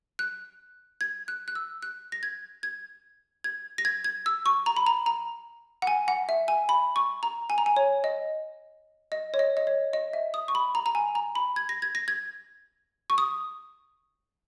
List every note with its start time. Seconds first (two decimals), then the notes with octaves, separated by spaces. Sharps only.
0.19 F#6
1.01 G#6
1.28 F#6
1.48 F#6
1.55 E6
1.82 F#6
2.12 A#6
2.23 G#6
2.63 G#6
3.44 G#6
3.78 A#6
3.85 G#6
4.04 G#6
4.26 E6
4.46 C#6
4.66 A#5
4.77 B5
4.86 A#5
5.06 A#5
5.82 F#5
5.87 G#5
6.08 F#5
6.29 E5
6.48 G#5
6.69 B5
6.96 C#6
7.23 A#5
7.50 G#5
7.58 A#5
7.66 G#5
7.76 C#5
8.04 D#5
9.12 D#5
9.34 C#5
9.39 D#5
9.57 D#5
9.67 C#5
9.93 D#5
10.13 E5
10.34 D#6
10.48 C#6
10.55 B5
10.75 A#5
10.86 A#5
10.95 G#5
11.15 A#5
11.35 B5
11.56 G#6
11.69 A#6
11.82 G#6
11.95 A#6
12.08 G#6
13.10 C#6
13.18 D#6